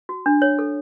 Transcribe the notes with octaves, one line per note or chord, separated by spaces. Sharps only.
F#4
D4
C#5
A4